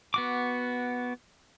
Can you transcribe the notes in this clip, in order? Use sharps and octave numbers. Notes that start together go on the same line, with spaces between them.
B3 F#4 D6